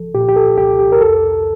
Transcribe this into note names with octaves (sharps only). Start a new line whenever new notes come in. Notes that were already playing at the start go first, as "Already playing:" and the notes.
Already playing: C2 F3 A4
A#2 G4
G4
A4
C2 G4
G4
A#4
F2 A4